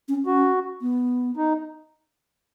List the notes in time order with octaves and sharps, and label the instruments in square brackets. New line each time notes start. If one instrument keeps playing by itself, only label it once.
[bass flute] C#4
[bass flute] C#4 [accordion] F#4
[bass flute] B3
[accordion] D#4